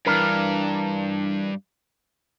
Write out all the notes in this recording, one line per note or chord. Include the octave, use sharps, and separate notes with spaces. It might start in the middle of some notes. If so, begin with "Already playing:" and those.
G2 E3 D4 A#4